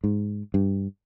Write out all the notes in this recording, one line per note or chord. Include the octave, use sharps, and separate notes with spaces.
G#2
G2